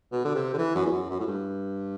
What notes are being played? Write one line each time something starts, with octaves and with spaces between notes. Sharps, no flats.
B2
D3
C3
D3
E3
F#2
E2
F#2
F#2
A2
G2